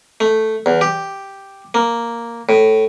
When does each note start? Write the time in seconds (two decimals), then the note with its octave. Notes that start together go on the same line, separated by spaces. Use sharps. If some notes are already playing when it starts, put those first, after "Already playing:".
0.20 A3
0.66 E2
0.81 G4
1.74 A#3
2.49 A2